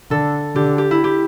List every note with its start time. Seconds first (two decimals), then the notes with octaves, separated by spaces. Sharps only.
0.11 D3 A4
0.56 D3 G4
0.78 G4
0.91 E4
1.04 G4